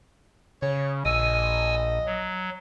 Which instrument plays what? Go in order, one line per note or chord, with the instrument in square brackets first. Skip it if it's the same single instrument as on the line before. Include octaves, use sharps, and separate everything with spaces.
[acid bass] C#3 [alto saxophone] C#5
[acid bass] A#1 [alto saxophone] D#5 [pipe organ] G#5 E6
[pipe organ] F#3